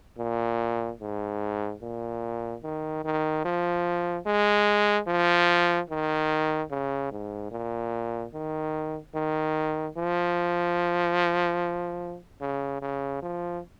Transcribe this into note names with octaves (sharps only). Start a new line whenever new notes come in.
A#2
G#2
A#2
D#3
D#3
F3
G#3
F3
D#3
C#3
G#2
A#2
D#3
D#3
F3
C#3
C#3
F3